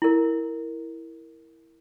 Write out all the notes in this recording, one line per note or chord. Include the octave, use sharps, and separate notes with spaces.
E4 A#4